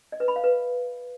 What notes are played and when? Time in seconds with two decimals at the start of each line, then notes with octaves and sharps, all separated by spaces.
0.12 D#5
0.20 B4
0.28 B5
0.36 F5
0.44 B4